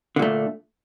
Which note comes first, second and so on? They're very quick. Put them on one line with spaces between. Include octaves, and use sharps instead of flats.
D3 A#2 A3